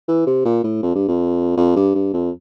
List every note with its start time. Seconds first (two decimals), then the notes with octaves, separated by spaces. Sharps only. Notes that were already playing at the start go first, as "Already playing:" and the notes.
0.08 E3
0.27 C3
0.45 A#2
0.64 A2
0.83 F2
0.95 G2
1.08 F2
1.57 F2
1.76 G2
1.95 G2
2.13 F2